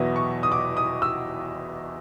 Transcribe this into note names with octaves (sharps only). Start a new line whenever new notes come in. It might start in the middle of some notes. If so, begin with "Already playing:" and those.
Already playing: E2 B2 F#3 B3 E4 D#6
C#6
D#6
D6
D#6
E6